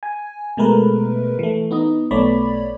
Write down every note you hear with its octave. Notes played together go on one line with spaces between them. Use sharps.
G#5
B2 G#3 A3 A#4 B4
E3 A3
B3 D#4 D#5
B1 A3 B3 C#5 D5 B5